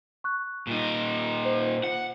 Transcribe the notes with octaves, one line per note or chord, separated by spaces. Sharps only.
C#6 F#6
A#2 D#4
C5
F#5